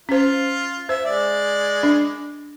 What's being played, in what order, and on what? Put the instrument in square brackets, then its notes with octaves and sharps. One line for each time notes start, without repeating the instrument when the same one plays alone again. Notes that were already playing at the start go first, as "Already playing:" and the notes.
[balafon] C#4 C5 [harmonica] F4
[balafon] C5 [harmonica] E5
[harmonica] G#3 D5
[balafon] D4